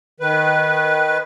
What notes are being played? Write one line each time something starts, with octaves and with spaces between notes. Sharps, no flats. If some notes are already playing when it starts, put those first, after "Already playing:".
D#3 B4